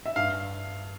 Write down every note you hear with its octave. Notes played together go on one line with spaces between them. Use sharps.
E5
G2 F5